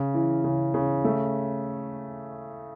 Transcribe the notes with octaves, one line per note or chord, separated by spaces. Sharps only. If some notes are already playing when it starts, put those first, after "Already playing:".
Already playing: C#3 C#4
E3
C#3
C#3
A3